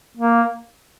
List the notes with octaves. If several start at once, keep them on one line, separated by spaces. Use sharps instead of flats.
A#3